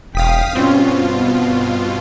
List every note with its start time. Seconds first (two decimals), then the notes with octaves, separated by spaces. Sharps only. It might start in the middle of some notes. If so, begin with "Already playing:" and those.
0.15 E1 F5 G5 D#6 B6
0.55 G2 B2 C4 C#4 F4
1.11 B3